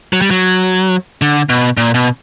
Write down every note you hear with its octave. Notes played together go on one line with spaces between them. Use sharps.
F#3
G3
F#3
D3
B2
A#2
B2